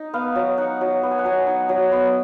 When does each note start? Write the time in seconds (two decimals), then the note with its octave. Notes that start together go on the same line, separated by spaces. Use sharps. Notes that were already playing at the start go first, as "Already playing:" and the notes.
Already playing: D#4 D#5
0.14 B3 F5
0.36 F#3
0.58 D#4 F#5
0.81 F#3
1.03 B3
1.11 G#5
1.19 F#5
1.25 F#3 G#5
1.47 D#4
1.69 F#3
1.92 B3